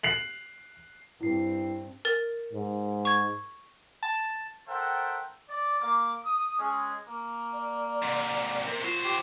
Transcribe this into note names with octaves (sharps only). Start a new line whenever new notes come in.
C7 F7 F#7
G2 C4 E4 C7
A#4 A6
G#2
C#6 G#6
A5
A4 A#4 C5 E5 F#5 G5
D5
A#3 D6
D#6
G#3 C#4 G#4
A#3
D5
G#2 C3
C3 A#4
F#3 F4 C5
G4